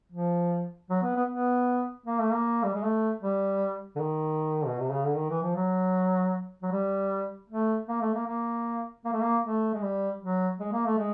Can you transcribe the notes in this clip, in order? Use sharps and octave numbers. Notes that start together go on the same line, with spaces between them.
F3
F#3
B3
B3
B3
A#3
A3
A#3
G3
G#3
A3
G3
D3
D#3
B2
C3
C#3
D3
D#3
E3
F3
F#3
F#3
G3
A3
A#3
A3
A#3
A#3
A#3
A3
A#3
A3
G#3
G3
F#3
G#3
A#3
A3
G#3